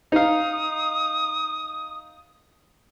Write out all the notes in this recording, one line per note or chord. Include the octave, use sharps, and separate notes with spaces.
D#4 F5 D#6